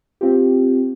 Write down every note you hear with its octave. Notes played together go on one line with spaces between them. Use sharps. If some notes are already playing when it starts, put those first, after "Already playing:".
C4 F4 G4